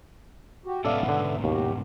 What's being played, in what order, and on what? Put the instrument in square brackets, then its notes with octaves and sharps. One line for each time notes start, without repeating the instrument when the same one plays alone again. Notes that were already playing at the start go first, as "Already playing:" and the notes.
[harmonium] F#4 G4
[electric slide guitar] G#2 B2 C#4 [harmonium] B3 E5 [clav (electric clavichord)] A4 D5 F5
[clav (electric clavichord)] D3
[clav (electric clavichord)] D#2 [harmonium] F#4 G4